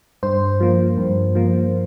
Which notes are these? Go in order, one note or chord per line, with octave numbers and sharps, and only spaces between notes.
G2 C5
F3 A#3
G2
F3 A#3